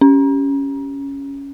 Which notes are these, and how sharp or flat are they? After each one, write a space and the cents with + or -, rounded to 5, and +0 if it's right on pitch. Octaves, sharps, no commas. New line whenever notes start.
C#4 +5